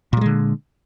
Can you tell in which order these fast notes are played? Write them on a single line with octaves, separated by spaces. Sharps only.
A#2 G3 G#3 D3